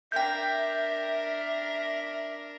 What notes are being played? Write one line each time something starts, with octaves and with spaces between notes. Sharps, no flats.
D4 A#4 E5 G5 G6